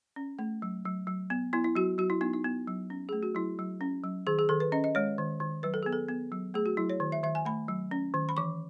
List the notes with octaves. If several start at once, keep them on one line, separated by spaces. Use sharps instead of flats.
C#4
A3
F#3
F#3
F#3
B3
B3 E4
E4
F#3 F#4
F#3 F#4
E4
B3 D#4
D#4
B3
F#3
C#4
A3 G#4
F#4
F#3 E4
F#3
C#4
F#3
D#3 G#4
G#4
D#3 A4
B4
C#4 D#5
D#5
G#3 C#5
D#3
D#3
F#3 B4
A4
B3 G#4
A4
B3
F#3
A3 G#4
F#4
F#3 E4
C#5
D#3
E5
D#3 E5
G#5
A3 B5
F#3
C#4
D#3
B5
E3 C#6